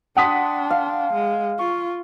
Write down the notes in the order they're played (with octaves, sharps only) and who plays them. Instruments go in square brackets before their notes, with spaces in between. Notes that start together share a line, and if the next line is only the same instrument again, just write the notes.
[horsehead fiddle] D4 [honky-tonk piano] F#5 D#6 B6 [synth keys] G5 A5 C6
[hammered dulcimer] F5
[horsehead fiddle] G#3
[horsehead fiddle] F4 [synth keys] C#6